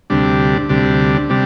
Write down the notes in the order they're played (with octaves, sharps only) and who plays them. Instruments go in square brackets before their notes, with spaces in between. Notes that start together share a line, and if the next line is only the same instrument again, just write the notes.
[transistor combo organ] D2 C3 G3 D4
D2 C3 G3 D4
C3 G3 D4